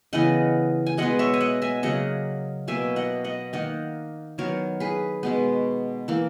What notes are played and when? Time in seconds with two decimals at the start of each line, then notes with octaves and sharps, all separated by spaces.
0.13 C#3 E3 B3 D#5 F#5
0.86 G#5
0.97 B2 G#3 B3 D#5 F#5
1.19 C#5 E5
1.34 G#5
1.40 D#5 F#5
1.62 E5 G#5
1.83 C#3 F#3 A#3 D#5 F#5
2.68 B2 A#3 E5 G#5
2.96 D#5 F#5
3.24 D#5 F#5
3.53 D#3 A#3 D#5 F#5
4.38 D#3 F#3 B3 A#4 C#5
4.80 G#4 B4
5.23 B2 G#3 B3
6.08 E3 A#3